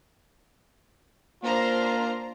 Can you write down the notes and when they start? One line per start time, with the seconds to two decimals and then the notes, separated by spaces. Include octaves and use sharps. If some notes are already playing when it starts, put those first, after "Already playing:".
1.43 A#3 D4 F4 C5 A#5